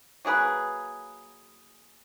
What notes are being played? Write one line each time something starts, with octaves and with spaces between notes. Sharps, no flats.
F#3 A#3 G#4 B4